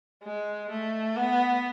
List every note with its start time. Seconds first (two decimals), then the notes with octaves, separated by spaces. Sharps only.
0.23 G#3
0.70 A3
1.17 B3